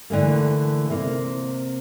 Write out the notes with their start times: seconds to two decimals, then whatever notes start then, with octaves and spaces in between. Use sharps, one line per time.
0.10 D3 E3 A3 A#3
0.90 C3 A#3